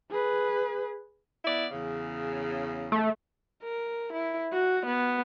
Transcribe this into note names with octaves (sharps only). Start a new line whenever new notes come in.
G#4 B4
B3 E4 D5
E2 C#3
A3
A#4
E4
F#4
B3